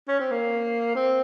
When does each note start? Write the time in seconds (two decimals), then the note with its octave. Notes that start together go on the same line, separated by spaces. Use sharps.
0.08 C#4
0.19 C4
0.31 A#3
0.95 C4